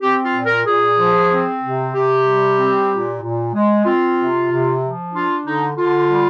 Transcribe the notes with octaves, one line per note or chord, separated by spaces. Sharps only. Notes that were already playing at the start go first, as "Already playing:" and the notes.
C4 G4
F4
A#2
A#4
A#2 G#4
F3
C4
C3
C3 G4
G3
C4
A#2
A#2
G#3
C4 F4
C3
C3
F3
D4 F4
D3 D#4
D3 F4
G3